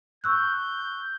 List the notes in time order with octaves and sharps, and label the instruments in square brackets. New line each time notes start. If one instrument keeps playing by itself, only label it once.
[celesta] C#6 E6 F#6 [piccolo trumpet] G6